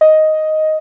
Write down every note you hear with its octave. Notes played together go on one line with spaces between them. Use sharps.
D#5